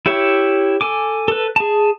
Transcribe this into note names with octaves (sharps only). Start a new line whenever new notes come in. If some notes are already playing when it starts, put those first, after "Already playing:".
E4 G4 C#5 E5
A4 G#5 D6
A4 B4
G#4 A5